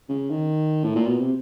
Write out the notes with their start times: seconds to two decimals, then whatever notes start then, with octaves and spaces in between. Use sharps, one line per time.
0.09 C#3
0.30 D#3
0.84 A2
0.96 A#2
1.07 B2
1.20 C3